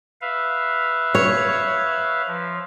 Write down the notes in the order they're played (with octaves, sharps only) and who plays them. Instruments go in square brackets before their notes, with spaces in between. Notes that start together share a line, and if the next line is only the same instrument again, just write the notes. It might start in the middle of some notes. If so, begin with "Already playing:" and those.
[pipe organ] B4 E5 F5
[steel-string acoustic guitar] C#5
[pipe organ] F3